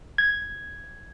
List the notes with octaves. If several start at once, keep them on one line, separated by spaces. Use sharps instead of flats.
G#6